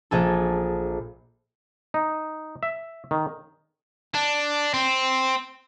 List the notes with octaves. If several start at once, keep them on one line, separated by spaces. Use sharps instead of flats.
A#1 G#4 A4
D#4
E5
D#3
D4
C4